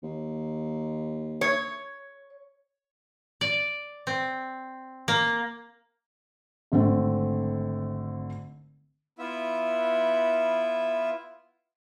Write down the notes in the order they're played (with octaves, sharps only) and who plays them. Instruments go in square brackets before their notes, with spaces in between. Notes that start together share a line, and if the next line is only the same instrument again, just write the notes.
[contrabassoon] D#2
[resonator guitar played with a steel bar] C#5
[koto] D5
C4
A#3
[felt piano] G#1 D3 A3 C4
[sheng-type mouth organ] B3 E4 F4 E5